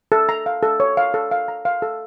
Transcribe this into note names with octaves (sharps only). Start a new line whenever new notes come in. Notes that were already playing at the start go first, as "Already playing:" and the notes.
A4
A#5
F5
A4
C#5
F5
A4
F5
A#5
F5
A4